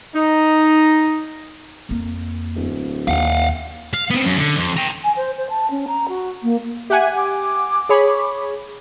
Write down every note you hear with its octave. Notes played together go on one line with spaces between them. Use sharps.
D#4
F2 A#3
D1
D#2 F5 F#5
F5
B3 C4
F#2
D3
F2
G5 A#5
G#5
C5
C5
A5
C#4
A#5
F#4
A#3
G4 E5 F#5 G#5
D6
G#4 C#5 B5